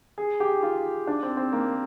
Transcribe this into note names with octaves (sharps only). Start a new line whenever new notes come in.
G#4
G4
F4
D4
C4
C4
A#3